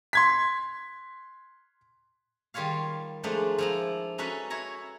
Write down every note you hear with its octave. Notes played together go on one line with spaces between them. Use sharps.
C6 G#6 B6
D#3 G3 F4 C#5 F5
F3 G#3 A3 D4 D#4
F3 E4 A#5
C#4 D#4 F#4 A4 B4
E4 C#5 A#5